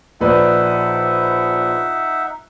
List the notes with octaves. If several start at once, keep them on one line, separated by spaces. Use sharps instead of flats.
A#1 D#4 B4 D5 E5 F#5